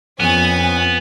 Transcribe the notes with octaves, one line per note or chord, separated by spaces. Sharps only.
F2 B3 C#4 G#5